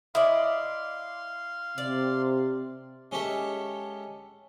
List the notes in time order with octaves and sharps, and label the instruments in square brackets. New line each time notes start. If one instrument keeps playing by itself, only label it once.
[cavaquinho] E4 [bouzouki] D5 D#5 [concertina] F5 C6
[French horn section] C3 [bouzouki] D5
[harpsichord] G#3 C#4 G4 A4 E5